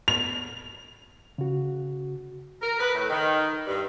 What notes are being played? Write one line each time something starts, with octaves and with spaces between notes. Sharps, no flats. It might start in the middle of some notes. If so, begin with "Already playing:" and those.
F7
C#3 F#4
A#4
B4
A2
D#3
G2